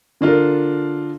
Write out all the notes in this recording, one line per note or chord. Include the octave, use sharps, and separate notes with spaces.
D3 D4 F4 A4 A#4